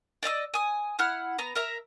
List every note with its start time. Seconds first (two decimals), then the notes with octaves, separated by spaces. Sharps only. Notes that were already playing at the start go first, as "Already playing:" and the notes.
0.23 D5 D#5 A#5 E6
0.54 G#5 D#6
0.99 E4 F#5 F6 F#6
1.38 B3 A#5
1.55 A#4 E5 A#5